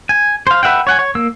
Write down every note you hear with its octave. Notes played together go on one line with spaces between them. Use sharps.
G#5
C5 F5
B4 E5 F#5 G5
C#5 F#5 G#5
C#5
A#3 E6